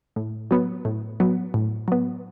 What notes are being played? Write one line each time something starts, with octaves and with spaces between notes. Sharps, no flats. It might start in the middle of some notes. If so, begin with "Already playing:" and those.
A2
F#3 B3
A2
F#3 B3
A2
F#3 B3